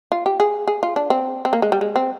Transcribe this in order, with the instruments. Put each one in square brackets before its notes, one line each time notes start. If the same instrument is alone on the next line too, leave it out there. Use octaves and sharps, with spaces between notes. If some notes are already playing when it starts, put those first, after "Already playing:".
[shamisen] F4
G4
G#4
G#4
F4
D4
C4
C4
A#3
G#3
G3
G#3
C4